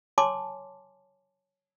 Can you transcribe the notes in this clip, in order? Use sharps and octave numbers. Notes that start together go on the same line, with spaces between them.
C#5 G#5 A5 C6 D6